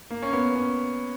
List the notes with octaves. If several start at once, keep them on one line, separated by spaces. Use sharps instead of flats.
A#3
C#4
B3
C#4